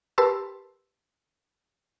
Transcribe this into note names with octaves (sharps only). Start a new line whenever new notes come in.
G4 A#4 B4 A5 C6 E6